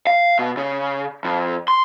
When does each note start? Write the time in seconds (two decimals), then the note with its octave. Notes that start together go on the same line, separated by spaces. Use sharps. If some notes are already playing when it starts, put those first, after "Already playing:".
0.07 F5
0.39 B2
0.57 C#3
1.25 F2
1.68 C6